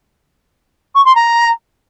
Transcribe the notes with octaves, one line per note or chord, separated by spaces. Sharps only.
C#6
C6
A#5